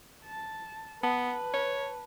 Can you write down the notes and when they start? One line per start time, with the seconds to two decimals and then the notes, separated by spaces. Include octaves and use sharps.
0.25 A5
1.03 B3 B4 A5
1.54 C#5